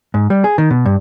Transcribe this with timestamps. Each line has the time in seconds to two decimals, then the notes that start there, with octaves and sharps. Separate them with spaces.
0.14 G#2
0.30 G3
0.44 G#4
0.58 D#3
0.70 B2
0.86 G2